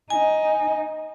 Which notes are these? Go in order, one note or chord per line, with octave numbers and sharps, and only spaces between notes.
D#4 G#5